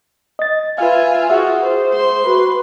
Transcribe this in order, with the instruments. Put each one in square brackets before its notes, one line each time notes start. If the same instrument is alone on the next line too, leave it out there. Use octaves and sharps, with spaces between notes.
[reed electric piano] D#5 A6
[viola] F4 [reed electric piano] B4 F5 [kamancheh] E5 G#5
[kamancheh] F#4 [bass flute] G#4 [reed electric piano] E5
[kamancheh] C5
[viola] C6
[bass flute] F#4 [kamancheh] B4